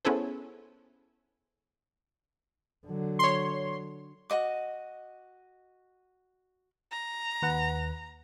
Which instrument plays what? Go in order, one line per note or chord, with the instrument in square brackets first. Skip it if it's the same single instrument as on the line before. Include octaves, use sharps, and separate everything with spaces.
[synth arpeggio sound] B3 C#4 E4 G#4 A4 C5
[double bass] D3 F#3
[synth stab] C#5 C6
[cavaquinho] F#4 C#5 D#5 D6
[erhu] A#5
[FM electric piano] D#2 B4 F#5